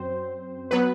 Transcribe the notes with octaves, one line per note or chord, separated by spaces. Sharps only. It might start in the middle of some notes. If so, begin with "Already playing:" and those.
Already playing: F#2 F#3 C4 C5
F#3 B3 B4